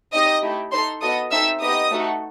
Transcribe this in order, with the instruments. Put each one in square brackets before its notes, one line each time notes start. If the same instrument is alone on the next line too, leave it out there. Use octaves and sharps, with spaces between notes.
[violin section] C4 D#4 G4 D#5 D#6
A3 E4 G4
D#4 A4 C5 C6
B3 F#4 A4 D#5 D#6
C4 D#4 A4 E5 E6
B3 D#4 G4 D#5 D#6
A3 D#4 F#4 A4